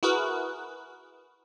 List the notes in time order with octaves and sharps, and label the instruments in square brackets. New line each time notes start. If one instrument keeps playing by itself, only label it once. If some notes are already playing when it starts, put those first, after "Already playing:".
[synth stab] E4 F#4 G#4 A#4 B4